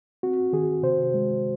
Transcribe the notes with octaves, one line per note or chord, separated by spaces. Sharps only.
C4 F#4
D#3 G#4
C3 C5
G#3